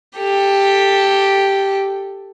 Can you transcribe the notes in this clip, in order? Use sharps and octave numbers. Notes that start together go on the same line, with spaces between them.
G4 A4